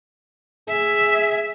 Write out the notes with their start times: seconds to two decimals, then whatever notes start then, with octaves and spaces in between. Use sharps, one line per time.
0.68 G#4 E5